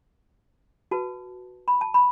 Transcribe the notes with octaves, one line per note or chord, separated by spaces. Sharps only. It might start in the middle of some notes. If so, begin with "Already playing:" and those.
F#4 B4 A5
B5
A5
B5